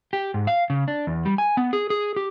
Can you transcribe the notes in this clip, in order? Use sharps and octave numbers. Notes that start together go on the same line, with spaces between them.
G4
G#2
F5
C#3
D4
E2
G3
G#5
B3
G#4
G#4
G4